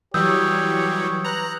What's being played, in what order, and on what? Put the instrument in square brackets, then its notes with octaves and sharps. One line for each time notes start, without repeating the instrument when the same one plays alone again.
[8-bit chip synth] E3 F#3 G3 [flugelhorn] G4 [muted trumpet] C#5 [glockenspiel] D#6 E6 G6
[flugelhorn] B4 [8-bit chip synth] A#5 F#6